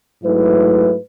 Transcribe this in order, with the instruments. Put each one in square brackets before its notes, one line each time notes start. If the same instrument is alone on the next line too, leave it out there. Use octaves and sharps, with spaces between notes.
[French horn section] G#2 F#3 A3 E4 B4